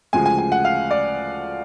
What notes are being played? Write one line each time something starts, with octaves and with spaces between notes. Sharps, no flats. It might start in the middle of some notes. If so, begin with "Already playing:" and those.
D2 C#3 F3 G#3 G#5
G#5
G#5
F#5
F5
D5